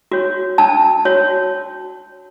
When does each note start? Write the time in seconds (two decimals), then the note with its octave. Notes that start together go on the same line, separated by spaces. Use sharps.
0.12 F#4 C#5
0.58 D4 A5
1.05 F#4 C#5